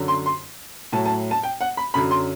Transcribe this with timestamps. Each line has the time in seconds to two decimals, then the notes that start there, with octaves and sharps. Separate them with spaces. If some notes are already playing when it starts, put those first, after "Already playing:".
Already playing: F#2 D3 F#3
0.08 C6
0.26 C6
0.93 A2 F#3 A5
1.06 A5
1.31 A5
1.43 G5
1.61 F#5
1.77 B5
1.94 F#2 D3 F#3 B5
2.11 C6